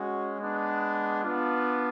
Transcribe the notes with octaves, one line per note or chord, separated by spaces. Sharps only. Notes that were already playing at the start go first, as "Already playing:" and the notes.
Already playing: G#3 C#4 F#4
G#3 B3 D4
B3 D4 F4